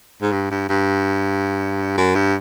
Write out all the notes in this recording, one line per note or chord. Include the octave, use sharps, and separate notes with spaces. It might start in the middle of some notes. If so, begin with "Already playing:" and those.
G#2
G2
G2
G2
F#2
G2